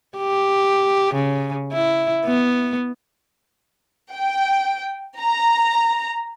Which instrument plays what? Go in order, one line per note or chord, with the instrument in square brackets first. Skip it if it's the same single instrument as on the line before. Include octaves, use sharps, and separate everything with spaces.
[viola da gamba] G4
C#3
E4
B3
[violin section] G5
A#5